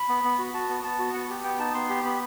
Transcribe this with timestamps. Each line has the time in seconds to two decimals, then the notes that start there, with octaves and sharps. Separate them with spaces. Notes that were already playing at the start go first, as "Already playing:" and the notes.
Already playing: B5
0.09 B3
0.24 B3
0.39 F#4
0.54 F#4 A5
0.69 B3
0.84 B3 A5
0.99 F#4
1.14 B3 F#5
1.30 G4
1.44 B3 G5
1.59 D#4 A5
1.74 B3 C6
1.89 G4
2.04 B3 B5